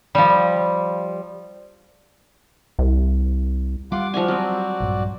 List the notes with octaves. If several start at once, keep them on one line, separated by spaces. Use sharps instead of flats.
F3 G3
C2
G3 F4 F#5 C6 D6
F3 F#4 C#5 D5 G#5
F#3 C4
A#1 G2